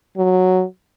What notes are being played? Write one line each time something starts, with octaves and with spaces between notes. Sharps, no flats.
F#3